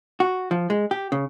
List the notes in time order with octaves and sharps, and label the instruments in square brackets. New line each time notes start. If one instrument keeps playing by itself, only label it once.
[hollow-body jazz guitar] F#4
F3
G#3
G4
C#3